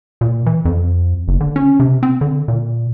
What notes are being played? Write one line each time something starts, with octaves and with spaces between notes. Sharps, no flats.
A#2
E3
F2
F#1
D3
C#4
C3
C4
D3
A#2